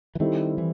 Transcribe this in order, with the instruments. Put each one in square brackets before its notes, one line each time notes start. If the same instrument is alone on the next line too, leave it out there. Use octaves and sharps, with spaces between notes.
[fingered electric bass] E3
[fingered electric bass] D#3 [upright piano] G3 C4 E4 A4
[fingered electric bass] E3